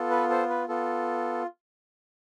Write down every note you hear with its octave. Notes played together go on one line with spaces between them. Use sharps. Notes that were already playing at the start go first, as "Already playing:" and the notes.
Already playing: B3 F4 A4
B4
A4 C5
B4
B3 F4 A4